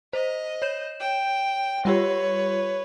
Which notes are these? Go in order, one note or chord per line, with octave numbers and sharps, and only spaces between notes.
C5 D#5
C#5 G6 E7
G5
G3 F4 G4 B4 C#5